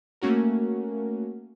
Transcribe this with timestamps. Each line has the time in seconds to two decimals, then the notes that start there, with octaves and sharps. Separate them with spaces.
0.21 A3 A#3 C#4 F#4 A#4